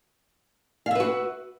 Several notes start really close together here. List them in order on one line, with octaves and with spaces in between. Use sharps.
F5 E5 B4 F#4